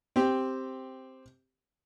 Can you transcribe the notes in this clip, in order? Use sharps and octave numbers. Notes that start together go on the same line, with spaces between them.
C4 G4